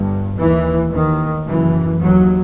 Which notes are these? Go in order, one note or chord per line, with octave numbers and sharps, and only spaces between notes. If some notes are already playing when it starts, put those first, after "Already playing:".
Already playing: G1 G2
D#2 E3
D#2 D#3
F#1 F#2 E3
D#2 F#3